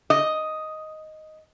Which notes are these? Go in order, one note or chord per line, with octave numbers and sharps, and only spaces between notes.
D#5